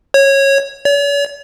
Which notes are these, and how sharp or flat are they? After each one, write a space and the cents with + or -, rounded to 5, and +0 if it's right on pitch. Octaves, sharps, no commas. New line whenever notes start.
C#5 -15
C#5 +45